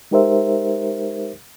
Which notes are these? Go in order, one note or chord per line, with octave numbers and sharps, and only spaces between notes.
G#3 D#4 G4 A#4 C5 E5